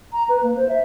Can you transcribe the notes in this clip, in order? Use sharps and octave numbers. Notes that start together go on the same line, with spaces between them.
A#5
B4
A#3
C5
E5